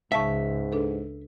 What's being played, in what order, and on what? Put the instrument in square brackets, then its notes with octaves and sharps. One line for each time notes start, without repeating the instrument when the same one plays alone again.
[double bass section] C#2 [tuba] G#2 [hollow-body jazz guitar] E5 [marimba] F5 A5 C#6
[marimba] D4 A4 B4